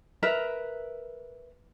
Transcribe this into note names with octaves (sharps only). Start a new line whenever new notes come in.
A#4 B4 E5 A#5